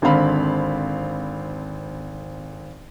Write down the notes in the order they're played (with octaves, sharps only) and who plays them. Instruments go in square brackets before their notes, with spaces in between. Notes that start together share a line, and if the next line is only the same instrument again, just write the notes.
[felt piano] G#1 D3 C4 F5 B5